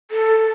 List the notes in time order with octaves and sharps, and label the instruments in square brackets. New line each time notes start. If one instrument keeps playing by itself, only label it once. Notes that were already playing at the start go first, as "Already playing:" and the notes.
[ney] A4